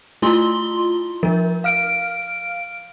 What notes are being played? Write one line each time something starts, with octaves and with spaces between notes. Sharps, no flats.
A3 E4 F4 C6 G7
F3 A#4
F5 F6 D7